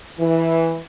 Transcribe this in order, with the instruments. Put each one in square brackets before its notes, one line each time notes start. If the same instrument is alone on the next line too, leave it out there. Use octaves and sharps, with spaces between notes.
[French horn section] E3